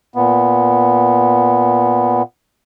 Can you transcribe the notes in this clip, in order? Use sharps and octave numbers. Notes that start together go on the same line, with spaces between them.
A#2 B3